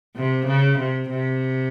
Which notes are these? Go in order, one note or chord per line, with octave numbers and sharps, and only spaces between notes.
C3
C#3
C3
C3